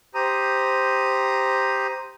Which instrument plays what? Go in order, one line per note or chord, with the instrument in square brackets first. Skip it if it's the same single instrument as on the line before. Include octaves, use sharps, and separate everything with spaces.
[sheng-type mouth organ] G4 C5 A#5 D#6